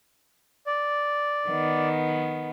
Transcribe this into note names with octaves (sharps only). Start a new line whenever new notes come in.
D5
D#3 B3